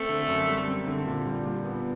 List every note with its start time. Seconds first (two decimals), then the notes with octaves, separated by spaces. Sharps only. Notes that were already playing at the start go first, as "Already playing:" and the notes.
Already playing: A3 C4
0.09 D3
0.28 F#2
0.49 G3
0.68 C4
0.87 D3
1.07 A#2
1.26 G3
1.45 A#2
1.65 B3